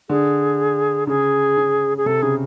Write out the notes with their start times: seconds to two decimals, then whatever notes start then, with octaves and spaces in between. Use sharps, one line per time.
0.09 D3 G#4
1.07 C#3 G#4
1.57 C#3
1.98 G#4
2.06 C3 A4
2.22 C#3 G#4